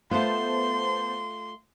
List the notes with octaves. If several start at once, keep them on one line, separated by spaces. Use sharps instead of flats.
A3 B3 F4 C5 A5 C6